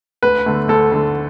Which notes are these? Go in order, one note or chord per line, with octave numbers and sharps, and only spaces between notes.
D2 B4
D3 A3
D2 A4
D3 A3